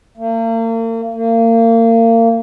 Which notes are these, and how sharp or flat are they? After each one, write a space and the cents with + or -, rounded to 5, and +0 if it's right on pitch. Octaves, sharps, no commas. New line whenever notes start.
A#3 -40
A#3 -30